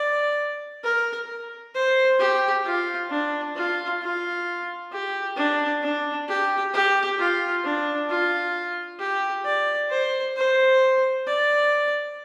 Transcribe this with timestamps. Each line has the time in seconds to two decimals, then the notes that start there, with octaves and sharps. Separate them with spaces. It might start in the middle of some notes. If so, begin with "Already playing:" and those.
Already playing: D5
0.83 A#4
1.74 C5
2.19 G4
2.65 F4
3.10 D4
3.56 F4
4.01 F4
4.92 G4
5.36 D4
5.82 D4
6.28 G4
6.74 G4
7.18 F4
7.64 D4
8.09 F4
9.00 G4
9.45 D5
9.90 C5
10.36 C5
11.27 D5